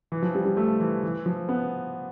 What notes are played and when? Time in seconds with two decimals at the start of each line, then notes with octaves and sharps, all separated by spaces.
0.12 E3
0.22 F3
0.35 G3
0.45 G3
0.57 A3
0.80 E3
1.03 E3
1.26 F3
1.49 B3